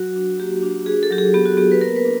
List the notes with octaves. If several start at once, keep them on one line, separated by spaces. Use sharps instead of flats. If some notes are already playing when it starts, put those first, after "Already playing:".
Already playing: F#3 F#4
D4
A#3 G4
D4
F#4 G#4
A4
F#3 G4
G#4
B3 G4
F#4
B3 G4
B4
A#3 A#4
B4
D4